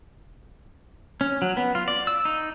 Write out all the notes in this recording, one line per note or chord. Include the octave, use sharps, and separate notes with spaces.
C#4
F#3
B3
F4
D5
E6
D#4